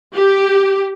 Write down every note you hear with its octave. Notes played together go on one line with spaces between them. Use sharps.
G4